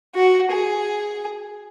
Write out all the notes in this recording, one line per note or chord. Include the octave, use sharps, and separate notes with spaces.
F#4
G#4